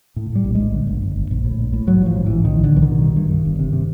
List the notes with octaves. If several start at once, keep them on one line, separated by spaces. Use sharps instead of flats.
A2
A2
G3
A#1
A#1 G#3
D3
G1
G1
G1
A#1
A2
A#1
A2
G#2 F#3
A1 F3
G#2
A1 E3
B1 D#3
B1
D3
B1 E3
D#3
B2
G2
G2
G2
G1
C3
C3